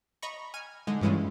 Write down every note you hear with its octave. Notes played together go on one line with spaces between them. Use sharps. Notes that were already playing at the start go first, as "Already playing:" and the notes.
D#5 A#5 B5 C#6
G#5 F6
D3 G#3 D#4
G2 E3 G#3 C#4 E4 F4